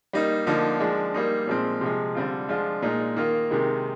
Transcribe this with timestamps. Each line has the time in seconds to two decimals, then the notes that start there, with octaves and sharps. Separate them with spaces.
0.13 G3 A#3 D#4
0.46 D3 F3 A#3 D#4
0.80 F3 G#3 D4
1.14 G3 A#3 D#4
1.47 A#2 F3 G#3 C4
1.81 C3 F3 G#3
2.15 D3 G3 C4 F4
2.49 F3 G#3 D4 F4
2.82 A#2 G#3 D#4
3.17 D#3 A#3 F4
3.51 C3 D#3 G#3